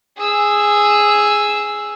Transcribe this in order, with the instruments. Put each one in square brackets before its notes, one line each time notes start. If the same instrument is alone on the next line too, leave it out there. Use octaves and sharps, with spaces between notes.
[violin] G#4 E6